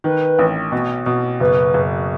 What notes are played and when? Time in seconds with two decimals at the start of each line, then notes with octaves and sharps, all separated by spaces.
0.04 D#3 B4
0.39 A1
0.72 B2
1.06 B2
1.40 F#1 B4
1.74 F#1